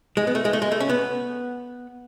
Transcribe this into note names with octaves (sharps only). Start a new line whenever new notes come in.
G#3
B3
A3
G#3
A3
G#3
A3
C#4
B3